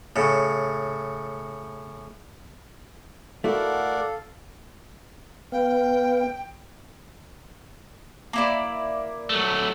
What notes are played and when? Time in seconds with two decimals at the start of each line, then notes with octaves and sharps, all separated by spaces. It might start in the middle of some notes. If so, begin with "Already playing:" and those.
0.16 A2 C#3
3.44 A3 E4 F#4 A4 A#4 D5 F5 F#5
5.52 B3 B4 F5 G5
8.33 A#3 E4 D5
9.30 F#3 A3